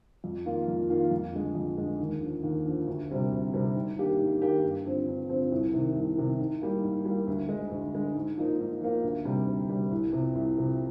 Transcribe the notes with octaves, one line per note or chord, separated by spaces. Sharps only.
F2
D#3 A#3 F4
F2
D#3 A#3 F4
F2
D3 G#3
F2
D3 G#3
D#2
D3 F3
D#2
D3 F3
D2
C3 G3 C4
D2
C3 G3 C4
G#2
D#3 A#3 D4 G4
G#2
D#3 A#3 D4 G4
G2
D3 F3 C4
G2
D3 F3 C4
C2
C3 D#3
C2
C3 D#3
G#2
G3 A#3
G#2
G3 A#3
D2
D3 G#3
D2
D3 G#3
G#2
F3 A#3 D#4
G#2
F3 A#3 D#4
D2
C3 G3
D2
C3 G3
C2
C3 F3
C2
C3 F3